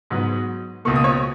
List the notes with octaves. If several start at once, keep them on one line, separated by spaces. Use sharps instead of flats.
G#2 F#3 B3
C#2 B2 A#3 C#6
D#6
C#5 C#6